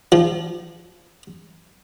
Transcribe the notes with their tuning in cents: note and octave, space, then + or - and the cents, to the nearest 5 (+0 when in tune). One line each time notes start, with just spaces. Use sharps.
F3 -20